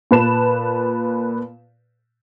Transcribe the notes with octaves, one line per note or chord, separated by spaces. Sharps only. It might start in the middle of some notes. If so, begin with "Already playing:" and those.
A#2 B4 A5 E7